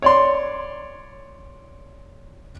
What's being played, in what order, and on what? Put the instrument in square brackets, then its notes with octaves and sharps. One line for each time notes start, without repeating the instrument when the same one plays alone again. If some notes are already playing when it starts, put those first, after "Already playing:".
[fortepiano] C#5 D5 C6